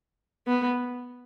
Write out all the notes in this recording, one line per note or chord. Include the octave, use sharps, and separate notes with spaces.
B3